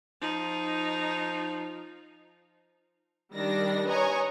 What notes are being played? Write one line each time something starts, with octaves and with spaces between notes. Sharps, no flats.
F3 D#4
D#3 G3 D4 D5 A#6
B4 C#5 D#5 G#5 A#5 C#6